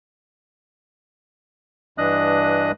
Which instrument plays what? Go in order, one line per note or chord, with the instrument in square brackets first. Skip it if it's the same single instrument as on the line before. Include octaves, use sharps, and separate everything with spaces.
[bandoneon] G2 E3 D4 D#5 D#6 F#6